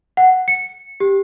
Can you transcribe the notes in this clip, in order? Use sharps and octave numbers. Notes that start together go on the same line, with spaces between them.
F#5
C#7
G4